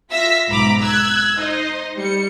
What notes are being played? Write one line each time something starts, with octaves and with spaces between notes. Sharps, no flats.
F4 E5 E6 A#6 B6
B1 G#2 A#5 B5 D6 B6
E6 F#6 G#6
D#4 C5 D#5
G3 C#7